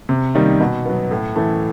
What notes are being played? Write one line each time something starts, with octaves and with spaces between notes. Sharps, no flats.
C3
D#3 G3 A#3 D#4
B2
F#3 B3
A2
E3 A3